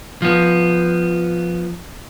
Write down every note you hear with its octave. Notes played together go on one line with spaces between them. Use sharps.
F3 B3